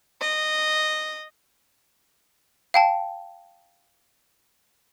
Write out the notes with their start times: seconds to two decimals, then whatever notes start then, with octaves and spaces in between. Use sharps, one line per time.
0.21 D#5
2.74 F5 G5 A5